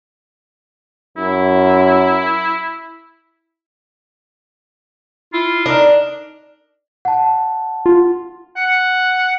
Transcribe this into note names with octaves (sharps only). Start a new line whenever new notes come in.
F#2 E4
E4 F4
D4 D#4 A#4
F#5 A5
F4
F#5